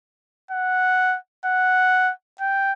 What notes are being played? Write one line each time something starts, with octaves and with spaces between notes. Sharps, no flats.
F#5
F#5
G5